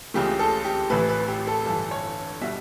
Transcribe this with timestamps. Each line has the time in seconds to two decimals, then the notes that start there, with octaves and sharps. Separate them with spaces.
0.14 C#2 C#3 E3 A3 G4
0.39 A4
0.65 G4
0.90 A1 A2 E3 A3 B4
1.09 B4
1.28 G4
1.47 A4
1.66 G1 G2 E3 A4
1.91 C#5
2.41 B2 G3 E5